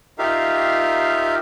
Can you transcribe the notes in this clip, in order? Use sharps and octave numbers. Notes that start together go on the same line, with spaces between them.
D#4 F4 G4 A#4 E5 F5